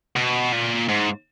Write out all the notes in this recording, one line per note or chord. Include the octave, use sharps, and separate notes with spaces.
B2
A#2
G#2